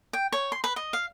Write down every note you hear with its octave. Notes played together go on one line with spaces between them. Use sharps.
G5
C#5
C6
B4
D#5
F5